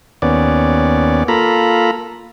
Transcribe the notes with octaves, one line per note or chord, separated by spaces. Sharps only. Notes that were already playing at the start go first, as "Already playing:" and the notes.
D#2 B3 C#4 D5
A#3 F4 A4 A#5 B5